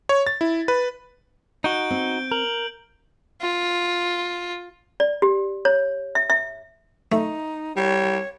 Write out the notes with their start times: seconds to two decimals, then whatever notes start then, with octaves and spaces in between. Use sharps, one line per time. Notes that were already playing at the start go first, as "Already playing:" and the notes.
0.09 C#5
0.27 A6
0.41 E4
0.68 B4
1.64 D#4 F#4 G6 D7 G7
1.91 C4
2.32 A#4 F#7
3.41 F4
5.00 D5
5.22 G4
5.65 C#5
6.15 E5
6.30 E5
7.12 A3 D#4
7.76 G3 C#5